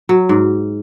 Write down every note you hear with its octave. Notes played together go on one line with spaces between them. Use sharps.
F#3
G#2